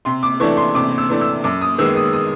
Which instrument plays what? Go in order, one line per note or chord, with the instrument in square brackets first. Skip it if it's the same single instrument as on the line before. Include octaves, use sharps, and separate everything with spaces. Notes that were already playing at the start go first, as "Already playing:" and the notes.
[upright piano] C3 C6
D6
E3 A3 D4 C#6
C6
C3 D6
E6
E3 A3 D4
E6
F#2 D6
D#6
D#3 G#3 B3 E6
D#6
D#6